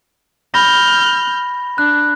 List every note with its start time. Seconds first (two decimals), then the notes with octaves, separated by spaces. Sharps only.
0.54 B5 F6 G6 A#6
1.78 D4 F#6